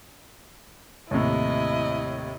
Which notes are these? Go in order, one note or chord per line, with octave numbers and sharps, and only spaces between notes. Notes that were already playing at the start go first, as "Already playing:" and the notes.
D#2 A2 C3 E4 D#5